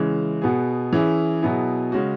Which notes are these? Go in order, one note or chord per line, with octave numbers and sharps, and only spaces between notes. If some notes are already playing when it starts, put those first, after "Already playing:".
Already playing: C#3 E3 G#3 C#4
B2 B3 G#4
E3 C#4 E4 G#4
B2 F#3 B3 E4 G#4
C#3 G#3 C#4 F#4